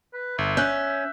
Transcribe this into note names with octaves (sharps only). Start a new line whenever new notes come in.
B4
G1 E5
C#4 F#6 G6